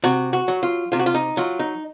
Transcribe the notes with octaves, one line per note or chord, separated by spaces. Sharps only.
C3 F#4
F#4
F#3
F4
C3 F4
F#4
F4
D#4
F#3 F4
D#4